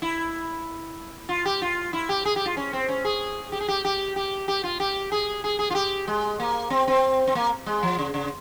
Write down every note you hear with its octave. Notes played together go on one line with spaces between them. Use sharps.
E4
F4
G4
F4
E4
G4
G#4
G4
F4
C#4
C4
C#4
G#4
G4
G#4
G4
G4
G4
G4
F4
G4
G#4
G#4
G#4
F4
G4
G#3
A#3
C4
C4
C4
A#3
G#3
F3
C#3
C#3